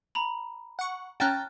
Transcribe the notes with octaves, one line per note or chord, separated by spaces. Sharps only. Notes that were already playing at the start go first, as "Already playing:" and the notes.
A#5 B5
F#5 C#6
C#4 G5 A5 A#5 F6 F#6 A6